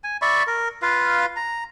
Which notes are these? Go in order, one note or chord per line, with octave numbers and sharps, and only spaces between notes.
G#5
D5 E5 B5 C#6
A#4
F4 B4 F5
A#5